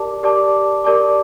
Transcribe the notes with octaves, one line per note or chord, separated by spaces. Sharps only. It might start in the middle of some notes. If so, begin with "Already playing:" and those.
Already playing: G4 A#4 D5 A5 D6
G4 A#4 D5 A5 D6
G4 A#4 D5 A5 D6